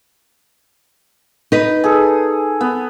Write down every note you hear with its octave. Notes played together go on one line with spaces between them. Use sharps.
D#4 B4
G#4 A4
B3